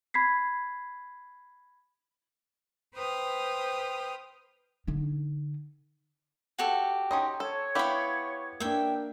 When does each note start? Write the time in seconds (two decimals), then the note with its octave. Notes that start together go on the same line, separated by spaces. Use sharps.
0.14 B5 G#6 B6 C7
2.94 B4 C5 G5 D#6 F6
4.87 D3 D#4
6.58 F#4 G4 A4
7.11 C#4 D#4 D#5 G5 C6 D#6
7.40 A4 C#5
7.75 B3 E4 G4 F5 B5
8.60 A#3 D4 E5 G5